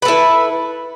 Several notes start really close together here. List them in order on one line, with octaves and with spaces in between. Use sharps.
B4 A4 E4